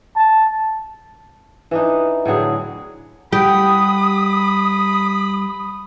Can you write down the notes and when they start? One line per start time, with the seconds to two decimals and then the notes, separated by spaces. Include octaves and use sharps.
0.16 A5
1.71 E3 D4 D#4
2.25 A2 D3 F#3 G#4
3.33 G3 G4 F#5 B5 D#6